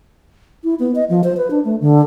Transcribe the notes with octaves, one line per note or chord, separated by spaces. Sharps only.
E4
B3
D#5
F3
C5
B4
D4
A3
D3